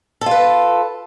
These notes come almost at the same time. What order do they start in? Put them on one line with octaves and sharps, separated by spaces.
A4 F4 B4